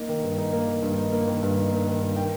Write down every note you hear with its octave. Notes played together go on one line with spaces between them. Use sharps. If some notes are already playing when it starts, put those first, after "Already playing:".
Already playing: A#3 D#4
D#3
G2
D#4
A#3
D#3
G2
D#4
A#3
D#3
G2
D#4
A#3
D#3
G2
D#3 G5